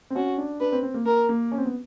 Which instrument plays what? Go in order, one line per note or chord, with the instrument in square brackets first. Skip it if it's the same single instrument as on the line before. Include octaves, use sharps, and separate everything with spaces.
[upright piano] C4
[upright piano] C#4 [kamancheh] F#4
[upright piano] D4
[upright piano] D4 [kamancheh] B4
[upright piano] C4
C4
A#3
[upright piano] A#3 [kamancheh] A#4
[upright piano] A#3
C#4
C4
B3